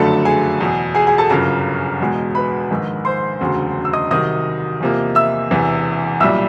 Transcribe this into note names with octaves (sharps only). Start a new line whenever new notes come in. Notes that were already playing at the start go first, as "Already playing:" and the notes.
Already playing: F#1 F2 D3 F#3 A3 A4 A5
G#4 G#5
E2 B2 F#3
G#4 G#5
G#4 G#5
A4 A5
G1 F#2 C#3 F3 A#4 A#5
E2 B2 G#3
B4 B5
A#1 G#2 D#3
C5 C6
E1 D2 C#3 F#3
E6
D#5 D#6
C2 C3 D#3 F#3 D#5 D#6
E2 C3 F3 A#3
E5 E6
E1 E2 C3 E3
B1 A#2 G3 E5 E6